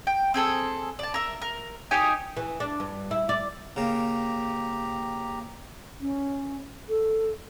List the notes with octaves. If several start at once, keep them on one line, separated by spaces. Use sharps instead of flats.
G5
C4 G#4 A4 E6
D5 A5
A#4 E5
A#4
D#4 G4 C#5 G#5
E3
D4
G2
E4
D5
C#3 A#3 G4 A#5
C#4
A4